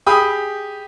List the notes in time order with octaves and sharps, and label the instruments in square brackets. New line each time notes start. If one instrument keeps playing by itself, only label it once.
[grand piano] G4 G#4 B5 D#6